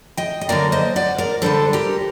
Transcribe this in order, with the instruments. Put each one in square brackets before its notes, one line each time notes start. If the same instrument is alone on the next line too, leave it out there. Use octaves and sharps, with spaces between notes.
[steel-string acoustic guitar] D#5 G5
D#5
D3 F#3 A#3 A#4 D5
C5 D#5
D5 F#5
A#4 D5
D3 G3 D4 A4 C5
G4 A#4